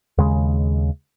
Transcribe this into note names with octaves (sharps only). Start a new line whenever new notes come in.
D#2 C#3 G#3